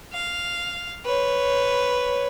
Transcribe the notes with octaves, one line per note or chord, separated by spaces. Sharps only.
F5
B4 C#5